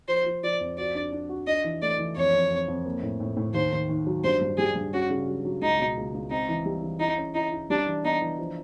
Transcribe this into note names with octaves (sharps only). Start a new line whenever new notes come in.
F3 C5
F3
F3 D5
F2
F#4 D5
D4
D4
F#4
D4 D#5
E3
A3 D5
E3
F2 C#5
F2
F2
F2
A#3
A2
A2
A2
D#2 C5
D#3
D#3
F#3
G2 C5
G2
G3 G#4
G2
C#4 F#4
C#3
F#3
F#3
C#2 D#4
B2
C#2
C#2
C4 D#4
E3
G3
E3
D#4 E4
C#4
D#4 E4
E4
G3 D4
E3
B3 D#4
E3
F3